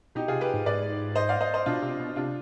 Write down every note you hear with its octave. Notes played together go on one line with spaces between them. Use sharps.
B2 D#4 G4
C3 F4 G#4
G4 B4
G#2
G#2 B4 D5
C5 D#5
D5 F5
C5 D#5
C5 D#5
B2 D4 F4
C3
B2
C3 D4 F4